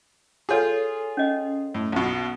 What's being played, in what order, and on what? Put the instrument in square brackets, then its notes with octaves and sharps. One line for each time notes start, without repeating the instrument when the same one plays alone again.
[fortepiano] F4 G#4 [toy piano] A4 C#5 D#6
[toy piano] C#4 D#5
[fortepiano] A2
B1 B2